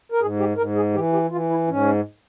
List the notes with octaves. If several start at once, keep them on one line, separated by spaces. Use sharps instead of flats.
A#4
G#2 G#4
G4
G#2 A#4
G#4
E3 G4
G4
E3 F4
E4
G#2 C#4